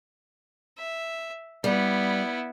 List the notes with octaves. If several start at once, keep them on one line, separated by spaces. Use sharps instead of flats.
E5
G3 B3 E4